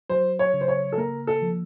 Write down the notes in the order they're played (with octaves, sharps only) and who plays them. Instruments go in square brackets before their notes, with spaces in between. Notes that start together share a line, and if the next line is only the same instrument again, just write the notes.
[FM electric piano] F#3 [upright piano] C5
[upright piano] C#5
[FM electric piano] C#3
[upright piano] C5
C#5
A4
[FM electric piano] A#3 [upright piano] A#4
[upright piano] A4
[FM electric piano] F3